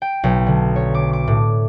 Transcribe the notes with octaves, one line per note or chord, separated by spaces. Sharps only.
G5
B1
D3
C#5
D6
D6
A2